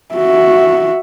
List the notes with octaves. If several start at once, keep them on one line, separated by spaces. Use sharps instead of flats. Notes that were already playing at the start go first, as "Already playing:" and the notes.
F#4 E5